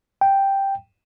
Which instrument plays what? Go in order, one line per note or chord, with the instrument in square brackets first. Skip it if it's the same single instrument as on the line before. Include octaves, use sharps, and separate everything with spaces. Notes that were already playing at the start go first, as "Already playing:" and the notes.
[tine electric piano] G5